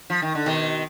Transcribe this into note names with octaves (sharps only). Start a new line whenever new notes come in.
F3
D#3
D3
B2 D#3